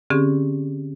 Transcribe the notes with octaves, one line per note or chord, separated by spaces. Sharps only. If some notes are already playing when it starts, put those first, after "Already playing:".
D3 C4 C#4 G4 G#4